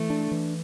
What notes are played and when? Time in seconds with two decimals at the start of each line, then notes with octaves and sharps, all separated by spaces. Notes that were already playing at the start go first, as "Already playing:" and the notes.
Already playing: E3 A3
0.10 D4
0.31 E3